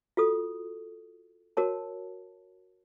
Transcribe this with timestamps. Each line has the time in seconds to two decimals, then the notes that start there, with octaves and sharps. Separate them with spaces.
0.17 F4 F#4 A4 D#6
1.57 F#4 A#4 C#5 A5